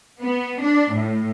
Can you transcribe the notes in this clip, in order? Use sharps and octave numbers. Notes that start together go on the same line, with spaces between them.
B3
D4
A2